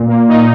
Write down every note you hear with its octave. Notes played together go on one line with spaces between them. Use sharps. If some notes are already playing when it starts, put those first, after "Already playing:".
Already playing: A#2
A#3
A#2 D#4